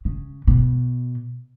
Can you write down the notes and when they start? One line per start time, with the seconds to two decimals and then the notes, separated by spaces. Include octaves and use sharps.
0.05 C#3
0.47 B2